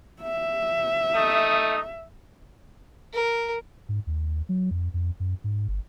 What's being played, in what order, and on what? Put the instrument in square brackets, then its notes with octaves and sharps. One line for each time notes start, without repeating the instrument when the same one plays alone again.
[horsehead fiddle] E5
[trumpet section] A3 D#4 D#6
[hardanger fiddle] A#4
[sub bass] G#2
D#2
F#3
F2
F2
F#2
G#2
G1